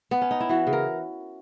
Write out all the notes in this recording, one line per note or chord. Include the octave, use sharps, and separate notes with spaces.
B3
C#4
D#4
E4
E3 F#4
C#3
A#4